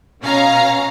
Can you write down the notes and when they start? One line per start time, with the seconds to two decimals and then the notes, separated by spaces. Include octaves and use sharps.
0.22 B2 C#4 F5 A#5